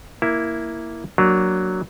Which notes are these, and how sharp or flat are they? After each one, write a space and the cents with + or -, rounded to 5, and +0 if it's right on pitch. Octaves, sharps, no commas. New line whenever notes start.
A#3 +0 E4 +0
F#3 +5 A#3 +0 D4 +0